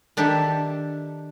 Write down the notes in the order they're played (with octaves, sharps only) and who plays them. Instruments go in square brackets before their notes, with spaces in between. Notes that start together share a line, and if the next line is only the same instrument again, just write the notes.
[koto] D#3 D4 G4 A4 E5